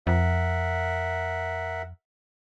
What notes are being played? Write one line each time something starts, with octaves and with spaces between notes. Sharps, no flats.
F2 A#4 E5 F#5